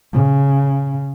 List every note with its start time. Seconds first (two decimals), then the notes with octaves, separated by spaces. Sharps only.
0.13 C#3